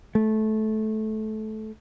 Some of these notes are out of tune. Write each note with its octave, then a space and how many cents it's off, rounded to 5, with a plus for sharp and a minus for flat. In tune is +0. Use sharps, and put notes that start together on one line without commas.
A3 -20